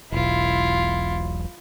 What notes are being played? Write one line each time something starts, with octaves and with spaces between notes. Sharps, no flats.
E1 B1 E4 F4